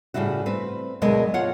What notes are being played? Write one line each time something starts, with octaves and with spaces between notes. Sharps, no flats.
A2 C#3 G3 E4 F#4
C4 B4
D2 B2 F#3 G#3 A#4 D#5
F4 C#5 F#5